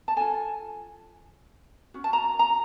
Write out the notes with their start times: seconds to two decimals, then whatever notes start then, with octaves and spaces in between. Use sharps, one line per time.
0.08 A5
0.16 F4 A4 G#5
1.94 C#4 F#4
2.04 A5
2.13 A#5
2.39 A#5